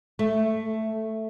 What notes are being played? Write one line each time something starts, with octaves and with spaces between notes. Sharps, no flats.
A3